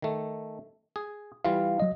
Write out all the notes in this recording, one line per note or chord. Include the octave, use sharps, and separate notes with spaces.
D#3 A3
G#4
E3 G3 F4 F5
F#3 D#5